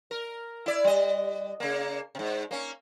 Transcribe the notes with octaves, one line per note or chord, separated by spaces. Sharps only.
A#4
E4 D5
G3 D#5
C#3 A#3
G#2 C3
A#3 C#4